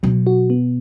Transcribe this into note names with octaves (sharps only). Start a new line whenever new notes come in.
B2 F#3
F#4
B3